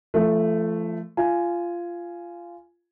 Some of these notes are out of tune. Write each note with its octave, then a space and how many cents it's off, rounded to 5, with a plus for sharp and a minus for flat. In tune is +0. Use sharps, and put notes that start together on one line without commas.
F3 -35 A3 +0
F4 -15 G#5 +5